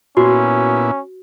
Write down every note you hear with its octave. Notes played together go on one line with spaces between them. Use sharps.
A#2 B3 C#4 E4 F#4